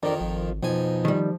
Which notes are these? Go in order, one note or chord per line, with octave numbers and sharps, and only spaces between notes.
F2 D#3 D4 A#4 D5
G#1 F3
F2 B2 F3 D#4 G#5
D#3 G3